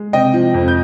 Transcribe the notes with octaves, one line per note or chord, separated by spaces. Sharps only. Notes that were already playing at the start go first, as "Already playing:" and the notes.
Already playing: G#3
C3 D#5 G5
F3
F2
G6